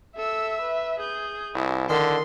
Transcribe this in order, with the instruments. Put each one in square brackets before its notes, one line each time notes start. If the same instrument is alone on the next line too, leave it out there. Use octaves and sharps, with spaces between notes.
[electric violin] A4 E6 [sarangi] E5
[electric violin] B4
[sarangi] G#4 [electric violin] G6
[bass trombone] C2 [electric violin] E4
[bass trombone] D3 [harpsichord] D#3 [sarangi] C6